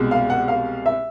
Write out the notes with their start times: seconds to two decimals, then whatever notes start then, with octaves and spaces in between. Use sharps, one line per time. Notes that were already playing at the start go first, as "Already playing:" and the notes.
Already playing: C2 B2 G#3
0.11 F5
0.30 F#5
0.48 F5
0.86 E5